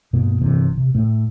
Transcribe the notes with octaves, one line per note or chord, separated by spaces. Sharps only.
G2 B2 G#3 A#3
G1 C3 E3
C3
A2 A3